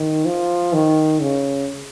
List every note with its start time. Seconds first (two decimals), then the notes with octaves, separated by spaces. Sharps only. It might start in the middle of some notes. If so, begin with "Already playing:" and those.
Already playing: D#3
0.25 F3
0.73 D#3
1.20 C#3